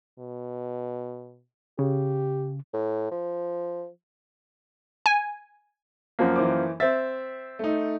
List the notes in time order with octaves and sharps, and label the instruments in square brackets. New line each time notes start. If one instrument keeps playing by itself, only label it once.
[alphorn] B2
[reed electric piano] C#3 [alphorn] G4
[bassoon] A2
F3
[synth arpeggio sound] G#5
[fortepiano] F#2 F3 A#3
[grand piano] E3 C5 D6
[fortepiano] C4 E5 [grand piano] A6
[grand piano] A3 D#4